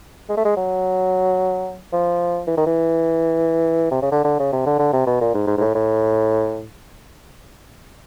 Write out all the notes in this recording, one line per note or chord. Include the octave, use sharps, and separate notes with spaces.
G#3
A3
G#3
F#3
F3
E3
D#3
E3
C3
C#3
D3
D3
C#3
C3
D3
D3
C3
B2
A#2
G#2
G#2
G#2
A2
A2